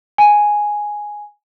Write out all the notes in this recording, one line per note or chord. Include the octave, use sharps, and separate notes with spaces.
G#5